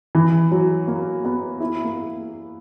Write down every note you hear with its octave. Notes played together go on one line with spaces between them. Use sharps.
E3
F#3
A#3
B3
E4
A#3